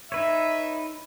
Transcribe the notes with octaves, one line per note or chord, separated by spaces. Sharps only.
D#4 B4 C#5 E5